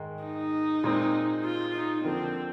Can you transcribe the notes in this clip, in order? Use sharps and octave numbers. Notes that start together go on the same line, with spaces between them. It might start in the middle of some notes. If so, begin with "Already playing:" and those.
Already playing: G#2 D#3 G#3
D#4
A#2 G#3 C4
F4
D#4
D3 F3 A#3 C4